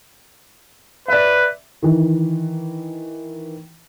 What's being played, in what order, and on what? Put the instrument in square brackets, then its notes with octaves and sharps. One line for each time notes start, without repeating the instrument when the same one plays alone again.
[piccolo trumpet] B4 [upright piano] D5 E5
[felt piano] D#3 E3